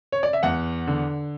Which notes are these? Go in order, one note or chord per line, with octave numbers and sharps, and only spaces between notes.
C#5
D5
E5
E2 F#5
D3